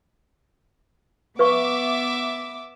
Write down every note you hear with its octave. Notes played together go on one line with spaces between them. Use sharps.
B3 B4 E5 F5 C#6 D6